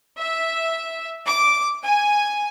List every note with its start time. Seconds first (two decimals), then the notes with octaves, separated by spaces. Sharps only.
0.17 E5
1.27 D6
1.84 G#5